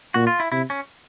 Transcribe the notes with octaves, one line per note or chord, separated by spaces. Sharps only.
A#2 F#4
F4
E4
C3 E4
C#4